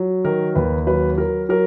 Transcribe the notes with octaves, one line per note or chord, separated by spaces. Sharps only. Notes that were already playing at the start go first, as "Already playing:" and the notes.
Already playing: F#3
D#3 A#4
D#2 B4
F#3 B4
F#3 A#4
F#3 A#4